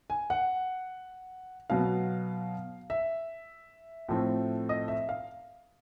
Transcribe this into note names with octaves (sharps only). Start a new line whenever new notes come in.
G#5
F#5
B2 F#3 B3 F5
E5
A2 F3 A3 C4
D#5
E5
F5